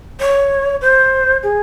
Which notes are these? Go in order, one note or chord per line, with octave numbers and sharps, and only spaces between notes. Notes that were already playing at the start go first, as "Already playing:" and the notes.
C#5
C5
G#4